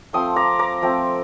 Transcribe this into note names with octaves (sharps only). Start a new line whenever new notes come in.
F3 A3 C4 C6 D#6
A#5 D6
A#5 D6
F3 A3 C4